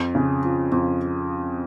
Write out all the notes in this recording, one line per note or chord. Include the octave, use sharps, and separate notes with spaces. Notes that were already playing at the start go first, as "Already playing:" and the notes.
Already playing: F2
C#3
F3
F2